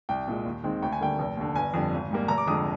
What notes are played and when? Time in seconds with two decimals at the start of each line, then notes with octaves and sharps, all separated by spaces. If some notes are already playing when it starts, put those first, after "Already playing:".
0.09 C2 G5
0.27 A#2 G#3
0.45 D#2
0.64 D#3 G#3 C4
0.82 D2 G5
0.92 G#5
1.01 D3 G3 A#3 G5
1.19 F1
1.37 D#2 D3
1.55 G1 G#5
1.74 F2 D3 G3
1.92 G#1
2.11 G#2 G3 A#3
2.28 F1 A#5
2.38 D6
2.47 F2 D3 G#3 D#6